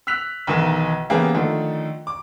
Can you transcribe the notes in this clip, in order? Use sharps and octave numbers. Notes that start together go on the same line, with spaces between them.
E6 F#6 B6 F7
B1 D#3 E3 A#4 E7
C#3 E3 A#3 B3 G4 G#4
D3 D#3 F3 A3
D6